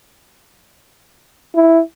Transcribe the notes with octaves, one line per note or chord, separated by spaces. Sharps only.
E4